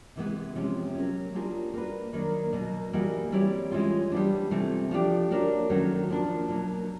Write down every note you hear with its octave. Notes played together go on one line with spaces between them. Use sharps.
C3 E3 G#3 B3
C3 F3 G#3 C#4 F4
F#3 A#3 C#4
G3 A#3 D4 F4 G#4
A#3 D4 F#4 B4
D#3 F#3 A#3 D4
B2 F#3 A#3
E3 G3 A#3 D#4 F#4
G3 C4 E4 G#4 C#5
E3 G#3 C#4 F4
G3 B3 D4
C3 E3 A3 C4 F4
F3 A3 D4 G4
A#3 D4 F#4 A#4 C#5
D#3 F#3 A3 C#4 F#4
F3 A#3 D4
B2 F#3 A#3